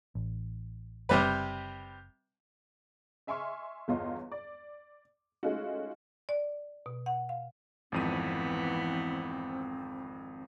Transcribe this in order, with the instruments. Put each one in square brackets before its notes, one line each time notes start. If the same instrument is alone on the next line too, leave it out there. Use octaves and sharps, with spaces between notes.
[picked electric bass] A1
[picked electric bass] F#1 [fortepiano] C3 G3 B4
[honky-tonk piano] D#5 E5 G#5 C6 C#6 F6
G1 E2 F4 C#5 D#5 C6
D5
G#3 A3 C#4 D#4 F4 F#4
[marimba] D5
B2
F#5
F5
[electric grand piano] G#1 F2 D#7 [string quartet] E3 B3 [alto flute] C4